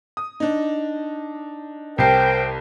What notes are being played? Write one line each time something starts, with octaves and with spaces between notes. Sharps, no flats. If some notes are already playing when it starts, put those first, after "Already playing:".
D#6
D4 D#4
C2 A#4 C5 G5 A5 C7